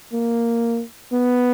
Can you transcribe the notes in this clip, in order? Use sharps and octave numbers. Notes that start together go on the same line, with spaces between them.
A#3
B3